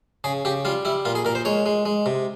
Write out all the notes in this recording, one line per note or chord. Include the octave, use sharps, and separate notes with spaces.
C#3 G#4
C#3 G4
G3 F4
G3 E4
A#2 F4
G#4
A#2 A#4
C5
G#3 C#5
G#3
G#3
C3